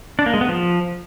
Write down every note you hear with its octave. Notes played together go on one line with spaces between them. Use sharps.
D4
A#3
G#3
B3
F3